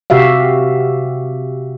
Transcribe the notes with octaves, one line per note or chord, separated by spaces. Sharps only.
C3 F#4 G4 E5 F5